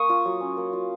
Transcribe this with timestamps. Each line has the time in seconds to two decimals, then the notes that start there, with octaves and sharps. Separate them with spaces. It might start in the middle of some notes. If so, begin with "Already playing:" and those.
Already playing: A#3 C#6 D#6
0.09 F4
0.25 F#3
0.41 C#4
0.57 A#3
0.73 F4